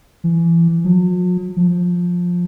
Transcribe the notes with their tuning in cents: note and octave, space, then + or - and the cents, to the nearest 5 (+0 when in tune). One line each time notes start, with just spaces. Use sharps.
E3 +30
F#3 -45
F3 +15